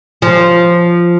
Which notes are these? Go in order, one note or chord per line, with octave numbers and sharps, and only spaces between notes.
F3